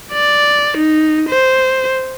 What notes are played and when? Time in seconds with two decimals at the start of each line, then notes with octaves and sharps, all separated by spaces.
0.13 D5
0.77 D#4
1.30 C5